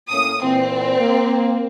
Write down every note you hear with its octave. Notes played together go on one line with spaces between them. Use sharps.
A2 A#3 C#4 D#6
A#2 E3 C4
A#3